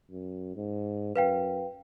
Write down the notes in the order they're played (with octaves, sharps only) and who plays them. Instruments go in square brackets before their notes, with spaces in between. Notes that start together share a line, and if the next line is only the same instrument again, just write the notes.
[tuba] F#2
G#2
[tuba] F#2 [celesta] B4 F5 G5